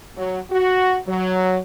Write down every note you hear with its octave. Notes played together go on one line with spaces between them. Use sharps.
F#3
F#4
F#3